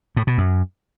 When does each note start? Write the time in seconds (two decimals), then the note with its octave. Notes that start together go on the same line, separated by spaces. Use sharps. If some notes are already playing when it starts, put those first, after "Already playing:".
0.16 A2
0.27 B2
0.38 F#2